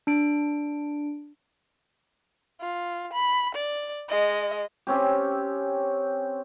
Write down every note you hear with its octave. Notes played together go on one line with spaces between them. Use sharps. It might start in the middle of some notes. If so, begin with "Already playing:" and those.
D4 D7
F4
B5
D5
G#3 D#5
C4 C#4 G4